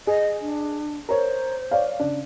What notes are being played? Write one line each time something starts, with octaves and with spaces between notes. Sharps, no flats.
G#4 D#5
D4
A#4 C5 C#5
C#5 D5 F5
C#3 D4